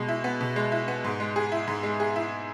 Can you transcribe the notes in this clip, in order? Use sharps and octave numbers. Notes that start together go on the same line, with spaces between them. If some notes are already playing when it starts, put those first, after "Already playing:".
Already playing: B2 G#3
E4
B3
B2
G#3
E4
B3
G#2
G#3
G#4
E4
G#2
G#3
G#4
E4